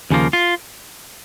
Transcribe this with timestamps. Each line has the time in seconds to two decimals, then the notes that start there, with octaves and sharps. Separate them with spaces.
0.10 D#2 C#3 F3 A#3
0.33 F4